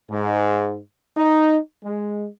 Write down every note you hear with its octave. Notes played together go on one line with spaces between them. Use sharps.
G#2
D#4
G#3